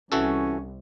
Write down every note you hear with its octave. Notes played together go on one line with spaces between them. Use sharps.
C2 E3 C#4 F#4 A4